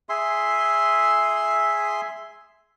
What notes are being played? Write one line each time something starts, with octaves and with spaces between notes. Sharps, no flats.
G#4 E5 C6